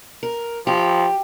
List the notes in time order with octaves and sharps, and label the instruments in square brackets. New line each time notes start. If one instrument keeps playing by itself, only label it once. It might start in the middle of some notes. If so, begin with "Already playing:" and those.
[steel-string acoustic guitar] A#4
[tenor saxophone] F3 [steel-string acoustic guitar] G4